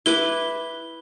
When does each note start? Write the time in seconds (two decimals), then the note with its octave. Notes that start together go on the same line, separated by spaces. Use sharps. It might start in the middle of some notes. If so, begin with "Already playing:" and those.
0.06 E4 B4 D6 G7